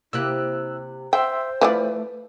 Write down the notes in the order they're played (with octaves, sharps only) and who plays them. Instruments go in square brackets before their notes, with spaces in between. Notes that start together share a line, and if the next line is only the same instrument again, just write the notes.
[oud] C3 A#3 G4 [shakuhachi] E4 [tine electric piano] E6 F#6
[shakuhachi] C5 [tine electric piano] E5 C6 E6 [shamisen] G5
[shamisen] E3 F3 D5 [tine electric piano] A3 [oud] B4